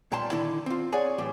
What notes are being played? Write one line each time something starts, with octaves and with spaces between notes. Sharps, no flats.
B1 A#2 G3 G5 A5 C6
D3 D#3 E4
C4 F4
G#4 C#5 D5 F#5 G#5
A2 E3 F#3 G4